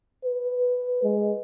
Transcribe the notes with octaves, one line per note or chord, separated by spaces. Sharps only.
B4
G#3